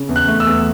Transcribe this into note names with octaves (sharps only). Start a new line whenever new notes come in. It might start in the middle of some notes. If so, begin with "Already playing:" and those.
Already playing: C#3
E2
F#6
A3
E6
E2